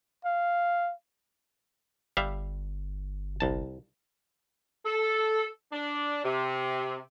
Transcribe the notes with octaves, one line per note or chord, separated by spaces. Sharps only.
F5
G1 G3 E5 F5
C2 A5
A4
D4
C3